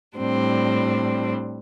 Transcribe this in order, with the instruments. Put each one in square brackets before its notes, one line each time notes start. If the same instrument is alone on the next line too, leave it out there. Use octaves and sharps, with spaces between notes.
[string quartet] A2 G3 C4 D4